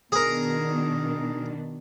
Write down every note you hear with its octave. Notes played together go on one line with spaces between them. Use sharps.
B2 D#3 D4 G#4 A#4